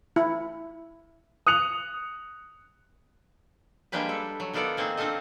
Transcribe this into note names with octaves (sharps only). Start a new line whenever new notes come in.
E4
D#6 F#6 C#7 F7
G3 G#3 A#3 D4 G4 B4
G3 A4
F#3
D#3 B3 F4 A4 D5 F#5
A#3 C4 D#4 G#4
C4 D4 F4 A4 D#5